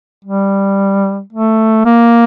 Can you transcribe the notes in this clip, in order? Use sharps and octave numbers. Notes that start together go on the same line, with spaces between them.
G3
A3
A#3